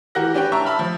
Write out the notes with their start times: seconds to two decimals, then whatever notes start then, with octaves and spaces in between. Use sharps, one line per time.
0.15 E3 F#4 G4 A#4 F#6 A#6
0.34 C#4 D4 G4 B4 C#5 G5
0.52 E5 A5 A#5 C#6
0.65 E5 A5 B5 F6
0.79 F3